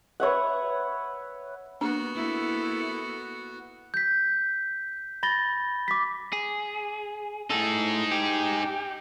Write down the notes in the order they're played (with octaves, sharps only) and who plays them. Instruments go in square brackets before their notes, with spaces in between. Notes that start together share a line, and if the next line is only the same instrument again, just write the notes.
[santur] B4 C#5 E5 F#5
[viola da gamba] A#3 [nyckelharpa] B3 F#4 [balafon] D4
[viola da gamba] A#3 E4 A4
[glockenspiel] G6 B6
B5 A6 A#6 G7
D6 B6
[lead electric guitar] G#4
[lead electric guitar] A2 A4 [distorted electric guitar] D#4 G#4
[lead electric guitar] G4